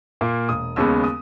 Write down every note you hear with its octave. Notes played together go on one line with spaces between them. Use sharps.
A#2 A#3
E1 D#6
D#2 C#3 G#3 B3 E6
D#6